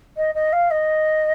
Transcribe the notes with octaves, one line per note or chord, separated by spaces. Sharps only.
D#5
D#5
F5
D#5